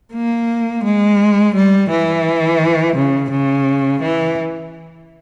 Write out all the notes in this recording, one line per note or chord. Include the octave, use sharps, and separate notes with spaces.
A#3
G#3
G3
E3
C#3
C#3
E3